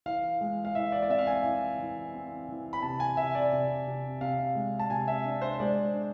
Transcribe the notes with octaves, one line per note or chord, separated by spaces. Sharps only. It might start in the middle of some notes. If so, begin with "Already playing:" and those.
E3 F5
G#3
F5
E3 E5
D5
D5
C4 E5
F5
G#5
E3
E3
C4
E3
B5
C3 A5
G#5
C3 E5
D5
C3
C3
C3 F5
G#3
A5
C3 G#5
E5
D4
C5
G#3 D5
D4